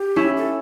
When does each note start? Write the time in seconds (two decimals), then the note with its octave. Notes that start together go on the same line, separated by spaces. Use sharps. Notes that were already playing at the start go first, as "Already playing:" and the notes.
Already playing: G4
0.16 C#4 E4
0.37 A4